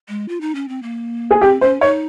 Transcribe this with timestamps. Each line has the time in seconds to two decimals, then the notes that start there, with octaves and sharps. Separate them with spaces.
0.09 G#3
0.28 F4
0.41 D#4
0.55 C#4
0.68 C4
0.83 A#3
1.31 G#4
1.41 C4 G4
1.61 C#4 C5
1.81 D#4 C#5